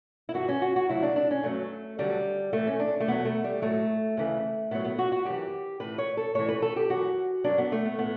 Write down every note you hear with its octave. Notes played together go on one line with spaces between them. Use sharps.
E4
G2 E3 F#4
C#4
F#4
F#4
D2 C#3 F#3 E4
D4
D4
C#4
G2 F#3 A3
D2 D3 F#3 G3
A2 E3 A3
C#4
D4
A3
E2 B2 F#3 B3
A3
G3
A2 F#3 A3
D2 C#3 E3
A2 F#3 B3
B3
F#4
F#4
F#2 E3 G4
A2 E3 B4
C#5
A4
A2 E3 C#5
B4
A4
G4
F#2 E3 F#4
G2 F#3 D4
B3
A3
B3
A2 E3 B3